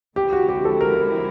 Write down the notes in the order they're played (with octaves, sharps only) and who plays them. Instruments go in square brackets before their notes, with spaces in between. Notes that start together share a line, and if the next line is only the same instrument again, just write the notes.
[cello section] D3 F3 G#3 C4 E4 [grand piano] G4
[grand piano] F#4
G4
A4
A#4